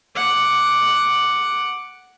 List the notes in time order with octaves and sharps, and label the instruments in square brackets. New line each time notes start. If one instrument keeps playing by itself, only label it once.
[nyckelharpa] F#5 D6